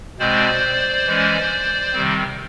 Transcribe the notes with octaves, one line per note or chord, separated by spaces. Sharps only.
B2 G#3 C4 C5 D5
E3 G#3 C#4
C3 D#3 G3 C4